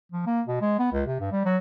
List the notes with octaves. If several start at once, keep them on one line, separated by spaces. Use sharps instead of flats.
F3
A#3
B2
G#3
B3
C#2
C3
G2
G3
F#3